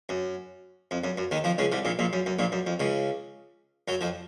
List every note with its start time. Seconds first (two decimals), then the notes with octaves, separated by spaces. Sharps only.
0.09 F#2
0.91 F2
1.04 F#2
1.18 F#2
1.31 D#2 D#3
1.44 F2 F3
1.58 C#2 C#3
1.72 C2 C3
1.85 A#1 A#2
1.99 A#1 A#2
2.13 F#2
2.26 F#2
2.39 A#1 A#2
2.52 F#2
2.67 F2
2.80 C#2 C#3
3.88 F#2 F#3
4.01 F2 F3